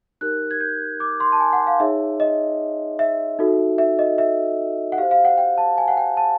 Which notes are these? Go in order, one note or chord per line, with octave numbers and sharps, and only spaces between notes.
D#4 G4 A#4 F#6
G#6
G6
D6
C6
A5
G#5
F#5
F5
D#4 G#4 C#5 E5
D#5
E5
D#4 F#4 A4
E5
D#5
E5
F#5
G4 C5 F5
F5
F#5
G5
A5
G#5
F#5
G5
A5